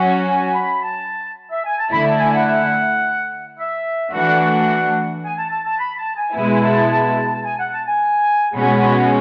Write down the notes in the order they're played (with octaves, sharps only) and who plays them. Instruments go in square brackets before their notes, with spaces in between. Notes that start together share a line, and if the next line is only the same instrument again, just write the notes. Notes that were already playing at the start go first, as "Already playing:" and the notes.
Already playing: [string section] F#3 C#4 F#4
[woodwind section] G#5
B5
A5
E5
G#5
A5
[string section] D3 A3 E4 [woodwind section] B5
[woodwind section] A5
G#5
F#5
E5
[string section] E3 A3 D4 F#4 [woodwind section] F#5
[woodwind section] G#5
A5
A5
A5
B5
A5
G#5
[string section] B2 G#3 B3 E4 [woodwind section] G#5
[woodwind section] A5
A5
A5
G#5
F#5
A5
G#5
[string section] B2 G#3 C#4 F#4 [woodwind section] B5